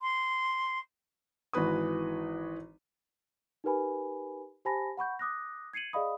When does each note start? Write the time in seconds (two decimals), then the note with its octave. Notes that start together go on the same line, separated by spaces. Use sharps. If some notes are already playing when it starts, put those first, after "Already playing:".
0.01 C6
1.53 G#1 E3 F#4 B4 D#6
3.64 D#4 G4 A#4 B4 G#5 B5
4.65 G4 C5 G#5 A5 B5 A#6
4.97 F#5 B5 C#6 G6
5.19 D6 D#6 F#6 A#6
5.73 G#6 C7 C#7 D#7 F#7
5.93 G#4 D5 D#5 F5 B5 D#6